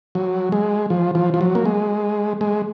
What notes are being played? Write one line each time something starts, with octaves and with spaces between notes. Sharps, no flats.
F#3
G#3
F3
F3
F3
F#3
A#3
G#3
G#3